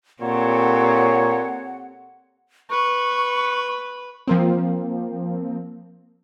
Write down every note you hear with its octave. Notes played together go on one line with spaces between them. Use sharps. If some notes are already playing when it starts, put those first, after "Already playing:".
A#2 C4 G4 A4 C#5 F#5
B4 C#6
F3 A#3 C4